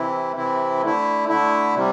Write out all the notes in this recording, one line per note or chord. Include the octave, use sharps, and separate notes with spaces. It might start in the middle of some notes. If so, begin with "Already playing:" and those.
Already playing: C3 E3 C4 E4
C3 E3 C4 E4
D3 A3 E4
D3 A3 E4
C3 G3